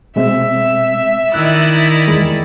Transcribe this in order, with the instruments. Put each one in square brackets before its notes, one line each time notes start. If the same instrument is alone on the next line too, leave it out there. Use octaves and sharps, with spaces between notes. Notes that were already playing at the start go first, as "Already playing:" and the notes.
[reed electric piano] B2 G#3 C4 [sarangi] E5
[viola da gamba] D#3 E4 D5 [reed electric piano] E6 F#6
[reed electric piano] E2 G#3